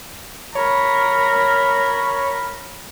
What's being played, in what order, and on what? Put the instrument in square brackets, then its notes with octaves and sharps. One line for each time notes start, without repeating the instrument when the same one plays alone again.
[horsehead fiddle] A#4 B5 [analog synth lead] C#5